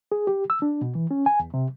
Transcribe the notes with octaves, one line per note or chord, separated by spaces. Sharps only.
G#4
G4
E6
D4
B2
E3
C#4
G#5
E2
C3